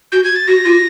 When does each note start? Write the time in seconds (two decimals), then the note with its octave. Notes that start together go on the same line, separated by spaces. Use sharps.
0.12 F#4 G6
0.24 G#6
0.36 A6
0.48 F#4 A#6
0.65 F4